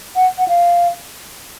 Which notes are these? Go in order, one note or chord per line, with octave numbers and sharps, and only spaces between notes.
F#5
F#5
F5